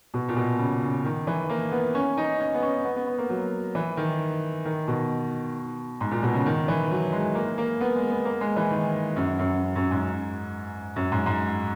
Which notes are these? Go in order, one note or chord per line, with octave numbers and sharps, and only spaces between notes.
B2
A#2
B2
C#3
C#3
D#3
E3
A#3
B3
C#4
D#4
C#4
B3
C#4
B3
B3
B3
A#3
F#3
E3
D#3
D#3
B2
G#2
A#2
B2
C#3
D#3
E3
F#3
G#3
A#3
A#3
B3
G#3
B3
A#3
G#3
E3
D#3
F#2
F#2
F#2
G#2
F#2
G#2
G#2